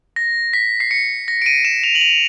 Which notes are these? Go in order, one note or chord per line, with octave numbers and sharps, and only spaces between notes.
A#6
B6
C7
C#7
A#6
D7
D#7
E7
F7
F#7
F7